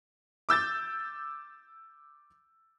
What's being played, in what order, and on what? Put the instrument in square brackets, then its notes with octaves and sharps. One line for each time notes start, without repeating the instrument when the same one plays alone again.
[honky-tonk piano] D6 E6 G6 A6